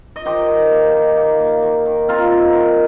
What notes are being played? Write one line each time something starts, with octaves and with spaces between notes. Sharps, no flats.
D#5
D#3 G4 C5
D#3
A#3
D#4
A#3
A#3
D#3
D#3
C4 F4 A#4
D#4
D#3